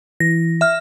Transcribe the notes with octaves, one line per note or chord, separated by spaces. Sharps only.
E3 A#6
E5 F6